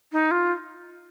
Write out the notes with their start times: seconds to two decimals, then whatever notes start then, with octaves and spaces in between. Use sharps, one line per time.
0.12 D#4
0.31 F4